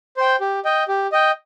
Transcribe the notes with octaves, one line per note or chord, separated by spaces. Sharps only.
C5 G5
G4
D#5 G5
G4
D#5 G5